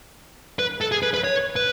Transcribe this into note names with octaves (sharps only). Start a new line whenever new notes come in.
B4
A4
G#4
B4
B4
C#5
B4